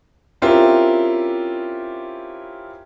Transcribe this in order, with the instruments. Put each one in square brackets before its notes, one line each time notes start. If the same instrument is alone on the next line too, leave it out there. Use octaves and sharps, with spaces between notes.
[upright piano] C4 C#4 E4 F4 G4 A#4